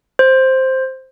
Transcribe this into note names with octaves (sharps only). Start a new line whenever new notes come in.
C5